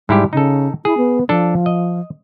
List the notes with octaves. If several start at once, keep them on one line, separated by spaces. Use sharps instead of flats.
G#2 G3 E4 G4
C#3 D#4 A4
E4 G#4
B3
F3 D4 A4
D#5